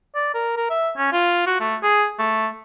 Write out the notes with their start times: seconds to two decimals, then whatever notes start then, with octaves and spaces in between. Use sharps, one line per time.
0.15 D5
0.34 A#4
0.57 A#4
0.70 E5
0.97 C#4
1.13 F4
1.46 F#4
1.60 A3
1.83 G#4
2.19 A3